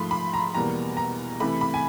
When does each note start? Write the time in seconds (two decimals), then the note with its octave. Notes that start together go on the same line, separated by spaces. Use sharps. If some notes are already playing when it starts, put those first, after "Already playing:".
Already playing: G#2 F3 A3 B5 C6
0.11 B5
0.33 A#5
0.54 E2 B2 G3 A#3 A#5
0.97 A#5
1.40 C3 E3 A3 B5
1.61 B5
1.74 G#5